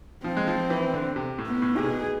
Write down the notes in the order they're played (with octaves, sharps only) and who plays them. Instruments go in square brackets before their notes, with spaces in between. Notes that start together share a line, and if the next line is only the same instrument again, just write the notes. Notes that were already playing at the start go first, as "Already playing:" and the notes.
[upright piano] F3 [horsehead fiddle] C4
[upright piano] G#3
F3
E3
D3
C3
A2
[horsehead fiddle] B3
[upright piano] A2
[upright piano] C3 [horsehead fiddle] G#4
[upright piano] B2